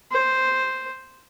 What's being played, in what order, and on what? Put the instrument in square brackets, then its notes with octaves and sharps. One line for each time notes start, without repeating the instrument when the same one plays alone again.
[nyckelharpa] C5